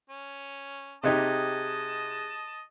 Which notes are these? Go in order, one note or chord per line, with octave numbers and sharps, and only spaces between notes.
C#4
C3 D#4 G4 G#4 D#5 A5 F#6 G#6